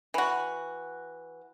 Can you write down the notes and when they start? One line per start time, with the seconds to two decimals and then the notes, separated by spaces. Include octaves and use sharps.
0.14 E3 F#4